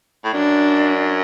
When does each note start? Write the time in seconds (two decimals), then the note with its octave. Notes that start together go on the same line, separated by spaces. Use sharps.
0.24 A2
0.33 F#2 D4